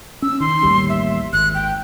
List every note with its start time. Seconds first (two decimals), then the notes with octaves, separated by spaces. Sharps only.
0.22 C#4 E6
0.40 D#3 C6
0.63 A1 D#2 G3
0.89 E5
1.33 G#1 F#6
1.55 G5